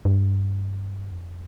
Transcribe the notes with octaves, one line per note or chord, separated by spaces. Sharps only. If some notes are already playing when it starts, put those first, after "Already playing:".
G2
F2